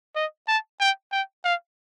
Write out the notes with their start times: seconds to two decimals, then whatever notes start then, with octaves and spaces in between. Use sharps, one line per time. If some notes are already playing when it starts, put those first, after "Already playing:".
0.16 D#5
0.48 A5
0.80 G5
1.12 G5
1.45 F5